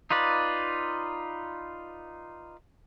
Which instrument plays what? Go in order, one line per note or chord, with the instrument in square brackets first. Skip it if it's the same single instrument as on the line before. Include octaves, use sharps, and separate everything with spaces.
[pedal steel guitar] D#4 F4 B4 D5